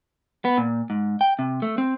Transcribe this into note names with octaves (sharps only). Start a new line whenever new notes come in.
B3
A#2
G#2
G5
C3
A3
C4